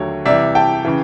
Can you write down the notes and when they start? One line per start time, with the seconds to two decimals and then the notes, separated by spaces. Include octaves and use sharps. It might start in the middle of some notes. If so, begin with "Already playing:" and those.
Already playing: D#2 D3 F#3 A3 C#5
0.25 C2 C3 E3 D5 E5
0.55 G5 A5
0.85 C#3 E3